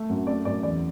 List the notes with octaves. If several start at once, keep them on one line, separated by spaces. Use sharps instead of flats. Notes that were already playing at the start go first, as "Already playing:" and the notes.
Already playing: A3
F#2
A3 D5
F#2 D5
E2 D5